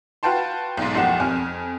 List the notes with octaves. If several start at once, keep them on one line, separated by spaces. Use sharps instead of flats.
F#4 B4 F5 G5 A5 C6
B1 G#2
F#1 B1 F3 G4 F#5 E7
F2 G#5 F6